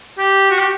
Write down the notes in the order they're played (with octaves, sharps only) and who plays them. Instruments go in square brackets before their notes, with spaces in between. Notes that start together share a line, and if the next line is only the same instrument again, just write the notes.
[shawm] G4
F#4
G4